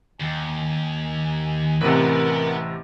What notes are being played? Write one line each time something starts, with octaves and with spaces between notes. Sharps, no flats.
D#2 G#5
A1 C3 A#4 B4 F#5